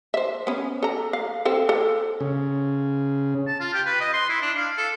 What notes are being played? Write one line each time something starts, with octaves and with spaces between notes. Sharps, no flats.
C5 E5
B3 C#4
A4 A#5
F5
C4 A4 F5
A4
C#3
A5
F4
G4
B4
D#5
C6
E4
D4
F5
A4